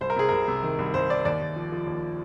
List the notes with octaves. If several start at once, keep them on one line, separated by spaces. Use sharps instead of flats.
C2 C5
A#4
C3 G#4
C2 A#4
C3
D#3
C2
C2 C5
D#3 D5
D#2 D5
D#2
F3
F3
D#2